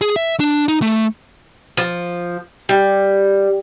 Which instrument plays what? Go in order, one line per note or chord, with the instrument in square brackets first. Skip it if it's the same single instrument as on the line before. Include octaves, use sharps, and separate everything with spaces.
[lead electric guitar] G#4
E5
D4
D#4
A3
[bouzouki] F3
G3